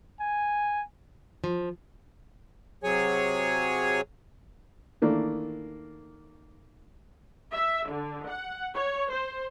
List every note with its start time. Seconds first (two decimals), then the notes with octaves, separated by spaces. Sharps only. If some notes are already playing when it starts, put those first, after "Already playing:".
0.20 G#5
1.44 F3
2.83 C3 F#3 G#4 C#5 G#5
5.02 D#3 E3 A3 A#3 D4
7.53 E5
7.89 D3
8.29 F#5
8.75 C#5
9.11 C5